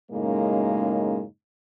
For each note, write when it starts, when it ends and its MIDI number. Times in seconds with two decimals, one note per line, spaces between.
0.12 1.23 42
0.12 1.23 45
0.12 1.23 49
0.12 1.23 56
0.12 1.23 58
0.12 1.23 63